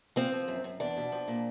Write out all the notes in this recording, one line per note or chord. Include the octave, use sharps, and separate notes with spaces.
F3 C4
F3
F#2
F#2
E2 D4
B2
F3
A#2